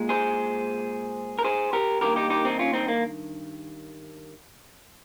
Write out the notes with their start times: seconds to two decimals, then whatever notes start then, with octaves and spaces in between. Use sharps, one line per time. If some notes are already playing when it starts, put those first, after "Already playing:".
Already playing: A#2 G#3
0.09 G#4 C5
1.39 A#4
1.44 G#4 C5
1.73 G4 A#4
2.01 G2 D#3 A#3 G4 A#4
2.16 D#4 G4
2.30 D#4 G4
2.45 C4 D#4
2.59 C#4 F4
2.73 C4 D#4
2.88 A#3